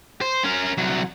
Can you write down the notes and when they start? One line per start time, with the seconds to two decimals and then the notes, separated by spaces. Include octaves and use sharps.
0.21 C5
0.44 C#4 A#4
0.78 C2 F#3